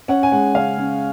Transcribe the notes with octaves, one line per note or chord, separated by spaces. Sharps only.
C#4 F#5
G#5
G#3 F#5
C#3 F5
C#3